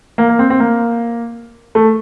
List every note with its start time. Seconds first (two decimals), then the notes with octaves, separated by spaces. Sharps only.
0.18 A#3
0.29 A#3
0.39 C4
0.50 C4
0.60 A#3
1.75 A3